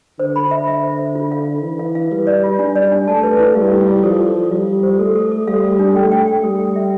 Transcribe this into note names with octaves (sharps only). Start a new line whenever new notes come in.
D3 C5
B5
E5
E5
C5
C5
F4
F5
F4
E3 F4
F5
F5
G3 B4
D5
F4
G3 D4
D5
D4
A3 A5
B4
E4
G3 F5
E4
E4
F3 A4
A4
A4
G3 F5
A4
C5
A3 A4
A4
A4
G3 F5
A4
D4
A3 G5
G5
G5
G3 A4
G5
E5